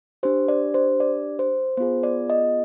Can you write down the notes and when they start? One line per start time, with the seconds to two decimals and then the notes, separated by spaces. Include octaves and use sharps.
0.23 D4 G4 C5
0.48 D5
0.74 C5
1.00 D5
1.39 C5
1.77 B3 F4 G#4 C5
2.03 D5
2.30 D#5